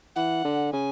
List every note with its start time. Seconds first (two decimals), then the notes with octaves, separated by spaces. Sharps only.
0.16 E3 F#5
0.45 D3
0.72 C#3 G#5